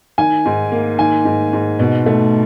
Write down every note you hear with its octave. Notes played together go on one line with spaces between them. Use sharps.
D#3 G#5
G#2
A#3
D#3 G#5
G#2
G#2
B2
A3